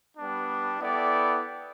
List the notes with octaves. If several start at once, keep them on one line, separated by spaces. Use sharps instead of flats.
G3 B3 D4
B3 E4 A4 D5 G5